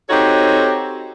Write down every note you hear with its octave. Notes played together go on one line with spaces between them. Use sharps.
C4 D#4 F#4 G4 A4 C#5